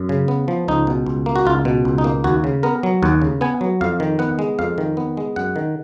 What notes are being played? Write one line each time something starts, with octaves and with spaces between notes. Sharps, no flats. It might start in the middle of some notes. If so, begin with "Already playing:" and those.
Already playing: F#2
C#3
B3
F3
C#2 D#4
B2
C#2
A#3
F#4
C#2 F4
B2
C#2
D#4
A#3
D#2 F#4
C#3
B3 A#4
F#3
D#2 F#5
C#3
B3 G#5
F#3
F2 F5
D#3
B3 F#5
G#3
F2 F5
D#3
B3
G#3
F#2 F#5
D#3